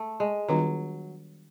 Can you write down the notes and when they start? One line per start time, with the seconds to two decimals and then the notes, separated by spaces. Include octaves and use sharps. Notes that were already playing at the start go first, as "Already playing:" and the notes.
Already playing: A3
0.20 G#3
0.48 D#3 F#3 G3 B3 D4 F4